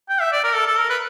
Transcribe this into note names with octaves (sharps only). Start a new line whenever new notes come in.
G5
E5
D5
A#4
A4
A4
A#4
B4